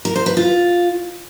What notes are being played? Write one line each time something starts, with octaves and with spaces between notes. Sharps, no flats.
A#4
C5
B4
F4